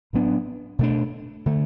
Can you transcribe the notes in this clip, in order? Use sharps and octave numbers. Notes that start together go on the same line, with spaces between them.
A2 F#3 B3 D4
B2 A3 D4
D3 A3